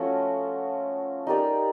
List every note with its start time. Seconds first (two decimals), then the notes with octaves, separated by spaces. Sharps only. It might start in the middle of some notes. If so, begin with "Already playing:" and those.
Already playing: F3 A3 C#4 F#4
1.27 D#4 G4 A#4 D5